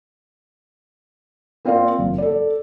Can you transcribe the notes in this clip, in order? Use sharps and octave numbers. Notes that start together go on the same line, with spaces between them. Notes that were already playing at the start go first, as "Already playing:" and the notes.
A#3 C4 F4 A#4 D5 F5
F#1
A4 D5